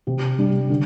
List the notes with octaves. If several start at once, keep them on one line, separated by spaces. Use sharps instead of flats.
C3
G3 D4
D3